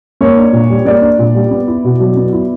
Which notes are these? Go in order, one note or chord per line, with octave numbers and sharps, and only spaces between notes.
A#3 C#5
D4
A#2
G3
A#3 D5
D4
A#2
G3
B3
E4
B2
F#3
B3
E4